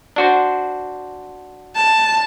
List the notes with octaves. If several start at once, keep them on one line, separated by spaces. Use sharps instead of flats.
D4 F#4 C5
A5